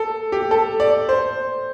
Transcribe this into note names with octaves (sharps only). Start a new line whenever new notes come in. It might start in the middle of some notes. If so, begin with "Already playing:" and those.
Already playing: A4
G4
A4
D5
C5